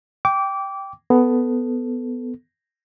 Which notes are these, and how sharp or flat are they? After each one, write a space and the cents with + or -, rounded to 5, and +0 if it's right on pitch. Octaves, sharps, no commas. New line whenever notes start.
G5 +0 D6 -20
B3 +10 A4 +0